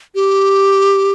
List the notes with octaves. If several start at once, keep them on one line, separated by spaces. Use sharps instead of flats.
G4